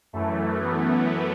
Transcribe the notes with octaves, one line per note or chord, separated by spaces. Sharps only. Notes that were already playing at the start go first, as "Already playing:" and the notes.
F#2 E3 A3
B3